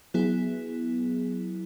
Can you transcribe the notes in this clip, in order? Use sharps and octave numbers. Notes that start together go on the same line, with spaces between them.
F#3 B3 E4 G#4